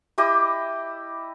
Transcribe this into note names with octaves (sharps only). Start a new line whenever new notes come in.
E4 G4 D#5 D6